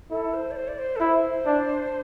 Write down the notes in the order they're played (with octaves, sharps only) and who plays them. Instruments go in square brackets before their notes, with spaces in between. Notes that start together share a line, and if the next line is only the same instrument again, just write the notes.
[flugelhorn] E4 [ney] A4
[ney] C5
D5
C5
D5
C5
A4
[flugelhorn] E4 [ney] C5
[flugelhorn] D4